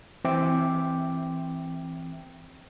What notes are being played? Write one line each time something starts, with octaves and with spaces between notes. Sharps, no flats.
E3 C4 E5 G5 D6